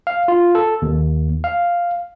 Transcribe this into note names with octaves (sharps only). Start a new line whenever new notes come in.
F5
F4
A4
D#2
F5